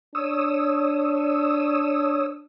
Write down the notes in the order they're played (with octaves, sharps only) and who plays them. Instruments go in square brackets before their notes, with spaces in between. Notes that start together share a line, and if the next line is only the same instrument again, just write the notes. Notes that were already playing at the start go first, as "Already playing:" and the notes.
[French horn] D4 [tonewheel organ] C#5 D#6 E6